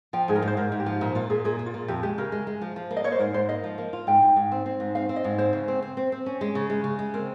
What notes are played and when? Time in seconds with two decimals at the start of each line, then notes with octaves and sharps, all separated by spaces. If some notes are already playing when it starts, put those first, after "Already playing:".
0.13 F3 G5
0.28 G#2 G#4
0.35 A#4
0.42 G#2
0.47 C5
0.57 G#2 A#4
0.72 G#2
0.80 G4
0.86 F3
1.01 A#2 D#4
1.15 A#2 F4
1.30 A#2 G#4
1.44 A#2 G#4
1.59 A#2
1.66 F4
1.74 A#2
1.88 F2 G4
2.03 G#3 G4
2.18 C#3 A#4
2.32 G#3
2.47 G#3
2.61 F3
2.76 F3
2.91 A#3
2.97 D#5
3.04 A#3 C#5
3.12 C5
3.19 G#2 A#4
3.34 G#2 C5
3.49 A#3 D#5
3.64 F3
3.78 A#3
3.93 F4
4.07 G#2 G5
4.22 G#2
4.36 G#2
4.52 C4
4.66 C4
4.80 G#2
4.95 C4 F5
5.09 C4
5.16 D#5
5.24 G#2
5.38 C4 C5
5.53 C#3
5.68 C4
5.82 C4
5.97 C4
6.12 C4
6.26 C#4
6.41 G#3
6.55 C#3
6.70 G#3
6.84 C#3
6.99 G#3
7.14 C4 A#4